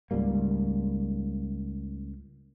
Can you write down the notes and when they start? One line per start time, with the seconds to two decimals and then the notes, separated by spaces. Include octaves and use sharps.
0.11 C#2 G#2 G3 A#3